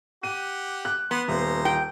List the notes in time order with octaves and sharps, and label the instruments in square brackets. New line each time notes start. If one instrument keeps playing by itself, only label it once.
[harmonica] G4 F#5 [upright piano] D#7
[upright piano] F#6
[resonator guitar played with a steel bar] B3 [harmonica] F#5 C6
[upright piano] D#1 [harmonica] C5 A#5
[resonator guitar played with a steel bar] G5